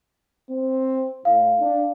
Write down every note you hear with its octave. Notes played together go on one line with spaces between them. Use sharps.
C4
A2 F5
D4